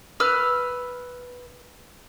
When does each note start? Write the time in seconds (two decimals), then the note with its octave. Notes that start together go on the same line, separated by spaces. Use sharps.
0.20 B4 E6 F6